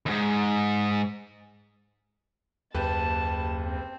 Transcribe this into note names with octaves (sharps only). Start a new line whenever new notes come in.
D#2 G#2
F#1 D#2 G4 B4 A5
C4